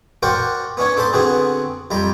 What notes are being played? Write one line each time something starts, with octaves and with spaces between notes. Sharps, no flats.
F#4 A#4 C5 D5 F#5 G5
B3 C#4 D4 C#5
D4 A4 C5 A5 B5
D3 B3 C4 D4 F#4 G#4
F2 G3 A#5 B5